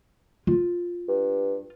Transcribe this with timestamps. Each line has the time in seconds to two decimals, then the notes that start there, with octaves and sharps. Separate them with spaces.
0.47 F4
1.08 G2